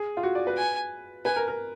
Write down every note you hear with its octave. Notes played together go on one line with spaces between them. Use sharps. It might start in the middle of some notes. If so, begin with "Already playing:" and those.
Already playing: G#4
F4
F#4
D5
B4
G#5
B4 G#5
A#4
A#4